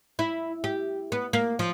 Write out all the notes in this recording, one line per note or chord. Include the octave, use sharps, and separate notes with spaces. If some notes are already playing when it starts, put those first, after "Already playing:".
E4
G4
B3
A#3
F3